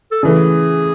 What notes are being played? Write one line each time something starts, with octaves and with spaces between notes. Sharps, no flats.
A4
C#3 E3 A3 G#4